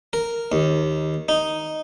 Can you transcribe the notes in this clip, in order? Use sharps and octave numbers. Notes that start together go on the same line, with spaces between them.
A#4
D#2
D#4